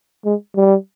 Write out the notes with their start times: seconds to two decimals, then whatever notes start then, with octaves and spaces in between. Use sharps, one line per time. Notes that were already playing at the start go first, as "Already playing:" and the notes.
0.25 G#3
0.56 G3